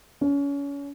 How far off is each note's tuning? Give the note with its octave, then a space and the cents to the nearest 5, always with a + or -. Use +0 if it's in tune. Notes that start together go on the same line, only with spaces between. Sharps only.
C#4 +30